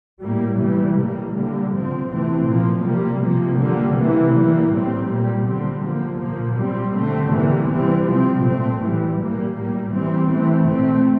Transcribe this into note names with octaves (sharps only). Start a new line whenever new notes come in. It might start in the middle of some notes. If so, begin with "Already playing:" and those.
A2 G3 A#3
C3 E3 G3
A2 G3 A#3
D3 G3 A#3
C3 F3 C4
C3 E3 A3 C4
A#2 F3 A#3
C3 G3 A#3
C3 F3 A#3
D3 G3 A#3
C3 E3 A#3
E3 G3 A#3
A2 G3 C4
A#2 G3 A#3
D3 G3 C4
D3 F3 A#3
A#2 F3 A#3
A#2 G3 C4
D3 A3 C4
C3 E3 G3 A#3
E3 G3 C4
C3 F3 C4
A#2 A3 C4
A2 E3 G3
A#2 G3 A#3
A2 G3 A#3
E3 G3 C4
E3 A3 C4
A#2 A3 C4